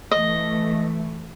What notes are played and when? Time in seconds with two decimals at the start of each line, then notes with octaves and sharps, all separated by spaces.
0.11 E3 A3 D#5